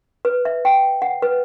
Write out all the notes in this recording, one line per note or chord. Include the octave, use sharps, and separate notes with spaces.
B4
E5
G5
F#5
B4